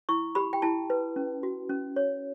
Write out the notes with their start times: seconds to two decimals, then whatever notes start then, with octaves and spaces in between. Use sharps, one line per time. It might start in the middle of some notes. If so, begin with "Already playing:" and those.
0.09 E4 C#6
0.35 G4 B5
0.53 G5
0.62 E4 A5
0.90 B4
1.16 C#4
1.43 F#4
1.69 C#4
1.96 C#5